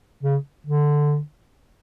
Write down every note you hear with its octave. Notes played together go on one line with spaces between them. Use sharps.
C#3
D3